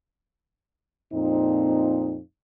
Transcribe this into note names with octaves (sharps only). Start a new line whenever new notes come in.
F2 A#2 C4 D#4